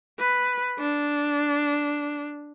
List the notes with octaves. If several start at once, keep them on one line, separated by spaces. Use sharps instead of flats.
B4
D4